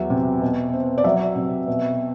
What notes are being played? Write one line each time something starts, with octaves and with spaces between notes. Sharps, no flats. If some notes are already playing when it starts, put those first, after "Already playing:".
Already playing: E2 F#3 E5
C3
B2
C4
D5
F#3 E5
C3
B2